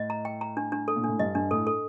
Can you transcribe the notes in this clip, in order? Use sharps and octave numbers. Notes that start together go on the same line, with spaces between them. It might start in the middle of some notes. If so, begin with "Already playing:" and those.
Already playing: A2 D#5
A#5
G5
A#5
D4
D4
A4
A#2
A2 D4
G2 D#5
G2 D4
A2 A4
A4